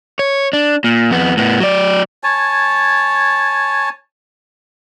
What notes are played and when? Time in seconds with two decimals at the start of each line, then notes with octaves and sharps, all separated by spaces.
0.19 C#5
0.53 D4
0.84 A#2
1.11 F2 B3
1.37 A2 B3
1.60 F#3 D5
2.23 C#5 G#5 A5